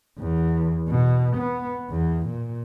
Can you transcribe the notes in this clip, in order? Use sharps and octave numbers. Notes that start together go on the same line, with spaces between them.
E2
B2
B3
E2
A#2